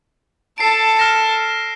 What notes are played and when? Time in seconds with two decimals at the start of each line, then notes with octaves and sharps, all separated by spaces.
0.58 A4 A5 C7 D7
0.97 F6 A#6 E7